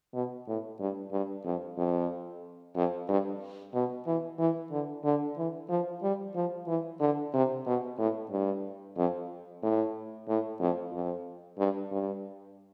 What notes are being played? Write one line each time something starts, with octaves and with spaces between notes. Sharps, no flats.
B2
A2
G2
G2
F2
F2
F2
G2
B2
E3
E3
D3
D3
E3
F3
G3
F3
E3
D3
C3
B2
A2
G2
F2
A2
A2
F2
F2
G2
G2